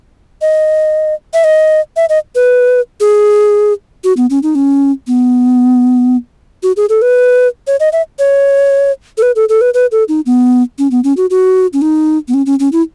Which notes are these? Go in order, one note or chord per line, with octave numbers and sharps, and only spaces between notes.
D#5
E5
D#5
E5
D#5
B4
G#4
F#4
B3
C#4
D#4
C#4
B3
F#4
G#4
A4
B4
C#5
D#5
E5
C#5
A4
B4
A4
A4
B4
B4
A4
D#4
B3
C#4
B3
C#4
F#4
F#4
C#4
D#4
B3
C#4
C#4
C#4
E4